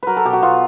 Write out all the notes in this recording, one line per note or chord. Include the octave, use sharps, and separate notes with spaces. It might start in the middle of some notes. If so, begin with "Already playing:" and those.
F#3 A#4 B4
A4
B2 G4
F#4
B3 F4